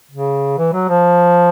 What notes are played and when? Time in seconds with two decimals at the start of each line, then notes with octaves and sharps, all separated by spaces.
0.11 C#3
0.58 E3
0.73 F#3
0.89 F3